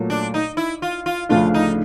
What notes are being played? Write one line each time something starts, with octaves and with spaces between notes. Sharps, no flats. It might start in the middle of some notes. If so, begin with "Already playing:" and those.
Already playing: A#2 F#3 A3
D4
D#4
E4
F4
F4
D2 C#3 F3 A3 D4 F4
D#4